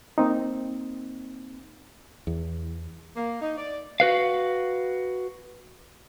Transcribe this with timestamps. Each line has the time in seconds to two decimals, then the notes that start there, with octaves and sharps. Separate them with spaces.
0.18 A#3 C4 D#4
2.27 E2
3.17 A#3
3.41 D#4
3.58 D5
4.00 F#4 B4 F5